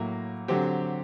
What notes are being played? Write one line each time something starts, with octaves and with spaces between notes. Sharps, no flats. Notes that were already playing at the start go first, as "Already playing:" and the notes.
Already playing: A2 F#3 A#3
D3 F#3 C4 G4